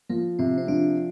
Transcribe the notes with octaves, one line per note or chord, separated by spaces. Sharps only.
F3 A#3
C3 C4
C4
F3 D4